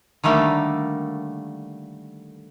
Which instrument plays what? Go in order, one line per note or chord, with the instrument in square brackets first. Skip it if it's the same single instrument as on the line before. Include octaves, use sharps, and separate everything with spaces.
[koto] D3 D#3 G3 A3 A#3